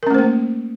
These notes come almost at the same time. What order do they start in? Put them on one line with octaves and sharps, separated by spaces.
A#4 C#4 A3 C5 A#3